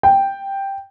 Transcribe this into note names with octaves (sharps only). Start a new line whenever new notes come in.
G5